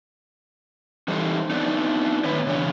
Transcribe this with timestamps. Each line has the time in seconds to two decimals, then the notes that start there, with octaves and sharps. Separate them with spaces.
1.08 E3 G3 D#4 A4 C5
1.50 B3 D4 D#4
2.24 A2 D#3 B4 C#5
2.47 C#3 E3 D4 C#5